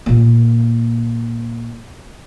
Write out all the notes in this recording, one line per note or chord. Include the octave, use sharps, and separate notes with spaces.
A#2 A#3